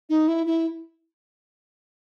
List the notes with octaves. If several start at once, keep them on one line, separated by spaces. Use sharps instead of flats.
D#4
E4
E4